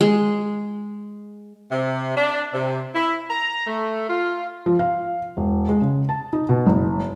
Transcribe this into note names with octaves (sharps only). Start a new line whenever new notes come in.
G#3
C3
D4
C3
E4
A#5
A3
F4
F3
F5
E1
G#3
C#3
A5
D#4
B2
F#1